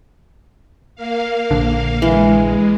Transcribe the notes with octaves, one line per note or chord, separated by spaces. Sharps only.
A#3 F5
A#1 D3
E3 G#3